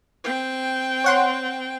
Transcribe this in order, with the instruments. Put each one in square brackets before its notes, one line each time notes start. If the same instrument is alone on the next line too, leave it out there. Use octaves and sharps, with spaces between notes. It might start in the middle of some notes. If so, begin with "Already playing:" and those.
[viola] C4 G5
[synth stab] C#5 F#5 C6